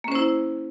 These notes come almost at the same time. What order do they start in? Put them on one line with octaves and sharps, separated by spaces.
A#3 C#4 C5 E4